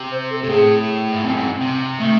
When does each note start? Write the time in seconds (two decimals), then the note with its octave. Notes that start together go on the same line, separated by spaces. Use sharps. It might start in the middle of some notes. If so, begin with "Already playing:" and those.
Already playing: C3
0.11 C5
0.30 A4
0.43 C3
0.49 A2 G#4
1.13 G#2
1.23 F#2 C4
1.36 G#2
1.61 C3
1.99 D#3 A3